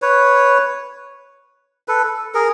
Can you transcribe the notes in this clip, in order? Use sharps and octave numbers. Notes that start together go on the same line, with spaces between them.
B4 C#5
A4 B4
G#4 A#4